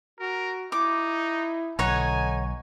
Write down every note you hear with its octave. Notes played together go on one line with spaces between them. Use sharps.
F#4 A#4
D#4 E4 D6
B1 D3 D#4 C#5 F#5 G#5